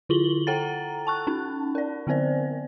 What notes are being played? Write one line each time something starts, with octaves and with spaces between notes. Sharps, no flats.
D3 E4 F4 F#7 G7
A4 F#5 G5 A#5 A6
A5 C#6 F#6
C#4 D#4
A#4 D5
D3 B3 C4 C5 D5